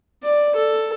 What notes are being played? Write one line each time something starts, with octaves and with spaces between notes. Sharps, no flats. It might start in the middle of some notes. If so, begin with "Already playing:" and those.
D5
A4